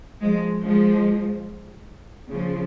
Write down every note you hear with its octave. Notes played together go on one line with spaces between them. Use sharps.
F3 G#3
F3 G#3
C#3 F3